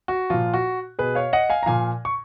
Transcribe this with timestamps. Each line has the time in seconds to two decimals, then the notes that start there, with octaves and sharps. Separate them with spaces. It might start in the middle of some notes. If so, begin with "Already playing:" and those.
0.08 F#4
0.30 A#2 F3 F4
0.54 F#4
0.99 B2 G#4 B4
1.15 C#5 F5
1.33 D#5 F#5
1.50 F5 G#5
1.63 A#5
1.66 A#2 F3 F5 G#5
2.05 C#6